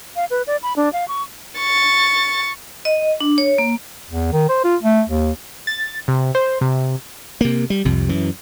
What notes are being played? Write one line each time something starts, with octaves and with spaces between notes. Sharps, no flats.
F5
B4
D5
B5
D4
F5
C#6
C#6 A6
D#5
D4
C#5
A#3
E2
D#3
C5
F4
A3
D#2
A6
C3
C5
C3
C3 A#3
G3
C2 F2 C3
F#2 E3